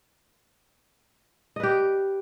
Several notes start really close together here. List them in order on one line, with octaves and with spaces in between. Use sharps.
D#5 B4 G4